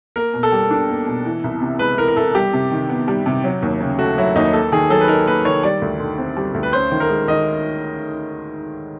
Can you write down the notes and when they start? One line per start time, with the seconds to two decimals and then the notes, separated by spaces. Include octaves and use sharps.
0.16 A#3 A#4
0.34 B2
0.43 A4
0.52 G3
0.71 D4
0.89 A#3
1.07 B2
1.25 E3
1.44 C2
1.62 C3
1.79 G#3 B4
1.98 E3 A#4
2.08 A#4
2.16 C2 A4
2.35 G3 G4
2.53 C3
2.71 D#3
2.89 B3
3.08 G3
3.26 C3
3.44 F#3
3.62 D#2
3.81 C#3
3.99 A3 F#4
4.18 F#3 E4
4.36 D#2 D#4
4.53 A#3 A4
4.72 D#3 G#4
4.90 F#3 A4
5.01 B4
5.08 D#4 A#4
5.26 A#3 B4
5.45 D#3 C#5
5.63 G3 D5
5.82 D2
6.00 D3
6.18 C4
6.37 G3
6.54 D2
6.63 B4
6.73 C#4 C5
6.92 D#3
7.00 A#4
7.10 G#3
7.28 D#3 D#5